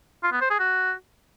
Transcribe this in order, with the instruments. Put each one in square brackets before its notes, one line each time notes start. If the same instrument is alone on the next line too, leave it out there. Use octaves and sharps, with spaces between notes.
[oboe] F4
B3
C5
G#4
F#4